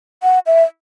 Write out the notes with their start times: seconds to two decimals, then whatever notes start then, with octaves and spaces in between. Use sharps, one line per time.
0.23 F#5
0.46 E5